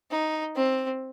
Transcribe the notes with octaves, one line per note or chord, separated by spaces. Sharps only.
D#4
C4